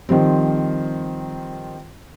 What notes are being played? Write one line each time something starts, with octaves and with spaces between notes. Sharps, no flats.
D#3 F3 G3 C4